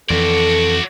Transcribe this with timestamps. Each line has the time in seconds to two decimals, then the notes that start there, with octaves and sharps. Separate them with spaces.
0.10 F2 E3 F#4 A4 D5